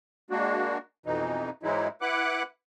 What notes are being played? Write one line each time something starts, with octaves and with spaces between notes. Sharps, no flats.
G#3 A#3 D4 F#4
F2 B2 E3 D#4
G#2 E3 F#3 G#3 D#4 E4
E4 B4 F#5 D6 F#6